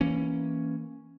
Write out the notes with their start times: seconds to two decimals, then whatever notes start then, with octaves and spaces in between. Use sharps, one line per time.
0.01 E3 A#3 C#4